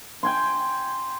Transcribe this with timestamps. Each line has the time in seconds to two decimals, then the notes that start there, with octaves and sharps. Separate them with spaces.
0.23 G5 G#5 C6